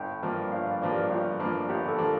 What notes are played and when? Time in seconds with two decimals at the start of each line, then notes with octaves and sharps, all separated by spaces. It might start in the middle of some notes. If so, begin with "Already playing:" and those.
Already playing: G1 G5
0.23 G2 F3 A#3 D4
0.52 G1 F5
0.71 D5
0.81 G2 F3 A#3 D4
0.91 G4
1.10 G1 F4
1.40 G2 F3 A#3 D4
1.69 G1 G4
1.89 A4
1.98 F3 A#3 D4